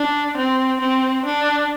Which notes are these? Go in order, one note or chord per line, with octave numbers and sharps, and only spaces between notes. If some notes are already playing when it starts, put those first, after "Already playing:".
Already playing: D4
C4
C4
D4